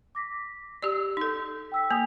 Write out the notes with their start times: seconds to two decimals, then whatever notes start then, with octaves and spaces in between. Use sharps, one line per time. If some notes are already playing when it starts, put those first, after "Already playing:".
0.15 D6 A#6 B6
0.83 G4 D5 E6
1.17 D#4 A4
1.72 G5 E6 B6
1.91 A#3 G#5 D#6 F7